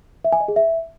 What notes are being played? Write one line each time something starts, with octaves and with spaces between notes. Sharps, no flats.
E5
G#5
D#5
G#4
E5